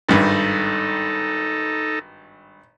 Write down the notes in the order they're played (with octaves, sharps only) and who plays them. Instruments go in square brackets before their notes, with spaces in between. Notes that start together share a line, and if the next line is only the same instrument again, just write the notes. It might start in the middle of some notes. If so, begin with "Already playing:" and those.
[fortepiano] G#1 G2 [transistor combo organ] D#4 A4